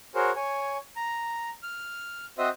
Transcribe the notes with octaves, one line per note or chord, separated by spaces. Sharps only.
F#4 G#4 A#4 C5 C#5
C#5 G#5
A#5
F6
C4 F#4 C5 D#5 E5 D#6